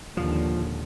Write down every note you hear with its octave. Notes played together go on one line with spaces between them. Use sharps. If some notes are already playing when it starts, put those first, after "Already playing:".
D#2 A#2 D3 D#3 F3 G#3